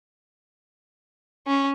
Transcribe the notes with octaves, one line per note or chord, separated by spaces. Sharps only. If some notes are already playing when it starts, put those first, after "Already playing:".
C#4